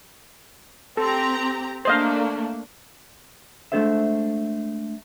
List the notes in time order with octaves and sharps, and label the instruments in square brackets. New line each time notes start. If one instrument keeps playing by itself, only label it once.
[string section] C4 G4 A#5 [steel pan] A4
[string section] A3 A#3 D4 [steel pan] C5 D#5 F5
[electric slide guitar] G#3 A3 D4 A4 C5 E5